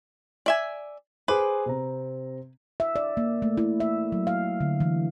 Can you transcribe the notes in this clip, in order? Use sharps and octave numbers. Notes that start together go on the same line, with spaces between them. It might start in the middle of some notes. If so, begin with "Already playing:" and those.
D5 E5 G#5
G#4 B4 C5 D6
C3 C4 A#5
E5
D5
A#3
A3
E4
E5
F#3
F5
D3
E3